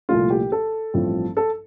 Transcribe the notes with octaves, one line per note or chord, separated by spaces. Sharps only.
C2 A#2 F3 A3 F4
G4
A4
A1 G2 F3 C4
A4